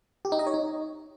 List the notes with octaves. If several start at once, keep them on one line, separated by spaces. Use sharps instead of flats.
G4
D#4
D#5
C#5
D#4